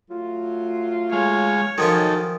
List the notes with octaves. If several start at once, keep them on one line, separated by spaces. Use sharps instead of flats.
F#3 A3 F4
G#3 C#5 F5
D#3 F3 F#3 C#4 D#4 A4